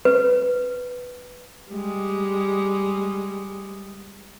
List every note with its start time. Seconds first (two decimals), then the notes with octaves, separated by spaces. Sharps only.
0.05 B4
1.71 G3 G#3